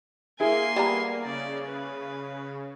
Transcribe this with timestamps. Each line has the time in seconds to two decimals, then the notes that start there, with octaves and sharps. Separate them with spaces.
0.40 A#3 E4 G#4 G#5 C6
0.76 G3 B3 A#5
1.25 C#3 D5
1.67 B4